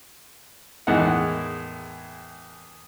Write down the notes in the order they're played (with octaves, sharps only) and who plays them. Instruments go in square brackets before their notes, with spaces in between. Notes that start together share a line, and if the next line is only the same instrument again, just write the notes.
[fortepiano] E2 A2 D#3 G#3 F#5